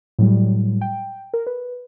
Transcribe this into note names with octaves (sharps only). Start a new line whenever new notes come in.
A2 F#3 G3
G5
A#4
B4